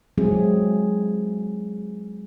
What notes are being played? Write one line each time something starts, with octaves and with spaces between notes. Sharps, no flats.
F#3 G#3 C4 E4 G#4